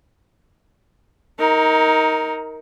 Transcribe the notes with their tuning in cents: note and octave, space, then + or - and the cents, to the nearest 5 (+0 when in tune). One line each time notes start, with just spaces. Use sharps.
D#4 +20 A#4 +0